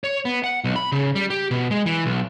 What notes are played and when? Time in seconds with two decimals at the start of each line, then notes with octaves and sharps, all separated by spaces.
0.04 C#5
0.25 B3
0.44 F#5
0.64 B1
0.76 B5
0.92 C#3
1.15 G3
1.30 G4
1.51 B2
1.71 G#3
1.86 E3
2.06 B1